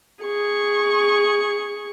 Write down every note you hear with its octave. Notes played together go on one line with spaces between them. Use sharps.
G#4 C#6